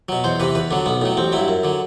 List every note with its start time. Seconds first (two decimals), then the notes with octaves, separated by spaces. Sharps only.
0.09 B2 F#3
0.24 E2 C5
0.40 C3 E3 B4
0.55 E2 B4
0.71 D3 F#3 D4
0.86 B1 B3
1.01 A2 F#3
1.17 A1 C4
1.32 G2 F#3 E4
1.48 F#2
1.63 D3 F#3